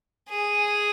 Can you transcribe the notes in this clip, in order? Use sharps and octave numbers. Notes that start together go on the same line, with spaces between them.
G#4